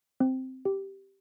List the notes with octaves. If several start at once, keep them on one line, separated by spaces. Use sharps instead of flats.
C4
G4